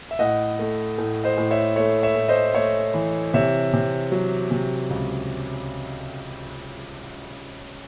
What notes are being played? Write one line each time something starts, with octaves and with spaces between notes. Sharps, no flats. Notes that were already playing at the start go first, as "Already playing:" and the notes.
E5
A2 D#5 F#5
A3
A2
C5 D#5
A2
C#5 E5
A3 C#5 E5
C#5 E5
A2
C5 D#5
A3 C#5 E5
E3
C3 C#5 E5
C3
F#3
C3
C#2